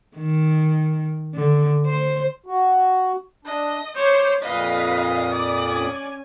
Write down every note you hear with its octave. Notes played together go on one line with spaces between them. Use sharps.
D#3
D3
C5
F#4
D4 D#5
C5 C#5 D6 G6
F2 A#2 B4 D#5 F5 D#6
D5
C#4 G#5